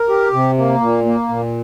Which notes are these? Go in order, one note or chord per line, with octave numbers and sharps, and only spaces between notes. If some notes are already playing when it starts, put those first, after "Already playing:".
Already playing: A#4
G4
C3
A#3
A#2
A#3
A#2